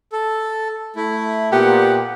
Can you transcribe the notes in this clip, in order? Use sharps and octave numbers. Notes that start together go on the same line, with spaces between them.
A4
A3 E4
A#2 B3 G4 F#5